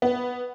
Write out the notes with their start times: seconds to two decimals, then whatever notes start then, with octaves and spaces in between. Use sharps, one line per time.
0.02 B3